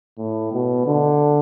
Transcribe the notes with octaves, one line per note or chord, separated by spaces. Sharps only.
A2
B2
D3